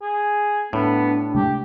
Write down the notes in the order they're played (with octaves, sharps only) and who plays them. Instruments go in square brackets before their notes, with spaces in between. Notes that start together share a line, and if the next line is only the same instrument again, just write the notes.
[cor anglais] G#4
[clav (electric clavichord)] A2 [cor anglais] B3 [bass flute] D4
[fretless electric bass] C3 G#3 A3 [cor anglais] G4